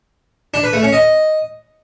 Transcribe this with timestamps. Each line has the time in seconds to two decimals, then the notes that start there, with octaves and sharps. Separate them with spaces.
0.54 D4
0.63 B4
0.73 A3
0.83 C#4
0.93 D#5